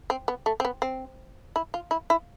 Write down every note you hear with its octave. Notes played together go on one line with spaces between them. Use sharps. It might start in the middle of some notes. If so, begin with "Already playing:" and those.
C4
B3
A3
C4
B3
C4
E4
F4
E4
E4